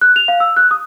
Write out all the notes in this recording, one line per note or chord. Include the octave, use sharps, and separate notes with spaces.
F#6
F7
F5
E6
F#6
D#6